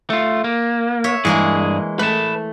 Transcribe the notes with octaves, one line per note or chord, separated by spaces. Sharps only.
A3 F4
A#3
C#5 E5
G2 E3 G#3 A#3 G#4
A3 B4 A5